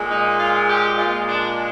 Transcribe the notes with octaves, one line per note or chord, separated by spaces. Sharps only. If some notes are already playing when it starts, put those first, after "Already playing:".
Already playing: A#2 G#3
D#4
F4
G4
A#2 G#3 F4
D4